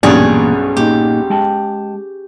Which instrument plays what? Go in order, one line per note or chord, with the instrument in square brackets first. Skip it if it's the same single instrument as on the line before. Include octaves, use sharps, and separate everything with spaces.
[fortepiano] B1 G2 D5 [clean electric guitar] E2 A#2 [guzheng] C#4 G#4
[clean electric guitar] A#2 D#4 [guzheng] G4
[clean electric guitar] G#3 G5 A5